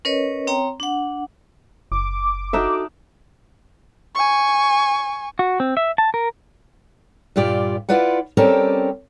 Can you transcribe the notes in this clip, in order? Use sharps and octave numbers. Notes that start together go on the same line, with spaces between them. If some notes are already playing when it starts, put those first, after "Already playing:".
C#4 A#4 B4 C#5 D#5
C4 C#5 G5 A#5
D4 F#5
F#1 D6
D4 D#4 F#4 A4 E5
G#5 C#6
F#4
C4
E5
A5
A#4
G2 A#2 F4 G4 D5
E4 F4 B4 D5 F#5
G3 C4 C#4 G4 A4 A#4